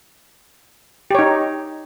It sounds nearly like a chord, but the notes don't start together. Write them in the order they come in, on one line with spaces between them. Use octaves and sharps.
G4 C#5 D#4